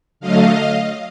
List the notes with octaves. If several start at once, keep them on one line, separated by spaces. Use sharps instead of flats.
D3 F#3 A3 D#5 F5